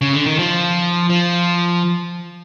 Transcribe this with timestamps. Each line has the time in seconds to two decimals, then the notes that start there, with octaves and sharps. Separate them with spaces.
0.01 C#3
0.14 D3
0.26 D#3
0.39 F3
1.10 F3